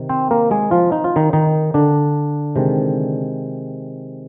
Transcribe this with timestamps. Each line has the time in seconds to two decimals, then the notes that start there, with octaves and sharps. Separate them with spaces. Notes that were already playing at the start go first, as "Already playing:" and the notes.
Already playing: C3 D#3
0.09 C4 C5
0.31 A#3 A#4
0.51 G#3 G#4
0.71 F3 F4
0.92 D#4
1.04 F4
1.16 D#3 D#4
1.33 D#3 D#4
1.74 D3 D4
2.56 C3 D#3 G#3